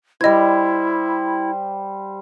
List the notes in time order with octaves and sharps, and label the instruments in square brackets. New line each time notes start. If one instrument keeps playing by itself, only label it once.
[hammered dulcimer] G3 C5 [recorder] E4 [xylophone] D#5 G#6